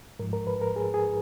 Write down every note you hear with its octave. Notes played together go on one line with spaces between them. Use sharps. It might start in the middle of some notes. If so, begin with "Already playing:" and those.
G#2 F3 A#4
A#4
B4
A#4
G#4
G#4